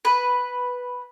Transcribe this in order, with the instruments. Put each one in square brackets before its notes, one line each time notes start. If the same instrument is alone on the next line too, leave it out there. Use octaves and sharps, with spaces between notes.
[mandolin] B4